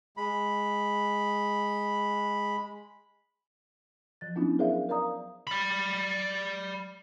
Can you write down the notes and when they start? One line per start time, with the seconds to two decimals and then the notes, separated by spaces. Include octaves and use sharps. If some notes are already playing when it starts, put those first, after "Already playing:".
0.17 G#3 B5
4.21 F3 A6
4.35 F#3 B3 C#4 D4 E4 F4
4.59 G#4 A#4 C5 D5 E5 F5
4.89 A#4 D5 F5 A#5 D#6
5.47 D5 B5